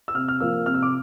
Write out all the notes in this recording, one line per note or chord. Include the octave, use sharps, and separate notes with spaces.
E6
C3 F6
F6
F3 A#3 E6
C3 F6
E6
D6